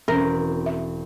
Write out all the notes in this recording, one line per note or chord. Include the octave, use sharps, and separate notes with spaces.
E1 C4 C#4 A#4 E5
E5